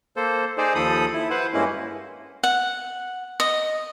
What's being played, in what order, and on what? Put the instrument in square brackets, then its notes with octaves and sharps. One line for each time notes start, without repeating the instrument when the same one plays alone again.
[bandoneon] A#3 A4 C5
D#4 G#4 C5 D5
D#2 F3 A4 B5 D#6
E4
B4 C5 F#5
G2 G#3 A#3 C#4 E4
[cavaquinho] F#5
D#5